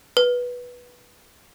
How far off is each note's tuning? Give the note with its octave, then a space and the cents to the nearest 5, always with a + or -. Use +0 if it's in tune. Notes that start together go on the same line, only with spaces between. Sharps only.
B4 -10